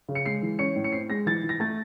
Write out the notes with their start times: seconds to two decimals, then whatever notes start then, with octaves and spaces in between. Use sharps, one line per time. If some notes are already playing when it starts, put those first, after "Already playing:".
0.09 C#3
0.15 C#7
0.26 G#3 C7
0.42 E3
0.59 C#4 C#7
0.76 A2
0.84 C#7
0.92 C4 C7
1.10 G#3 A#6
1.26 E3 A6
1.44 E3
1.49 A#6
1.60 A3 A6